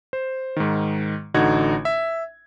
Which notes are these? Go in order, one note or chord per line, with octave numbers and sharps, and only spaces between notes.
C5
G#2 D#3
A1 D3 D#4 F#4 F#5 G#6
E5